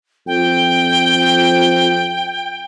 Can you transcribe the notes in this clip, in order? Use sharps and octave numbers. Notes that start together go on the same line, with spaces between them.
F2 G5